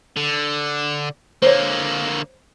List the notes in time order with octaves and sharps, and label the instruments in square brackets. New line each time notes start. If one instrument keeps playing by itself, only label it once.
[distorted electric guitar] D3
[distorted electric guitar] D3 A#3 [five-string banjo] C5 C#5